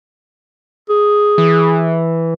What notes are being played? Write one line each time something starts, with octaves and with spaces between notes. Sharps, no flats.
G#4
E3